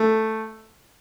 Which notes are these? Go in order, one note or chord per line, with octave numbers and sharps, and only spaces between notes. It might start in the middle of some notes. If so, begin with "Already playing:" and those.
Already playing: A3